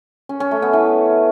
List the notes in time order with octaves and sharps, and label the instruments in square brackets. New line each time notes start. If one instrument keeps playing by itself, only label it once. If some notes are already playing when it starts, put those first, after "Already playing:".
[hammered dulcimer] C#4
C#4
A3
B3
E3